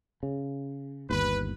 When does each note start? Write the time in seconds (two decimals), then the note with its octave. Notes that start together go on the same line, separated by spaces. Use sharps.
0.23 C#3
1.10 G1 D#2 B4